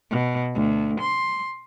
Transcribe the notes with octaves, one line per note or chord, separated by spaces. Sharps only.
B2
D2
C6